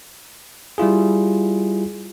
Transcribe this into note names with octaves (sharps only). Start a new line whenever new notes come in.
G3 E4 F4 G#4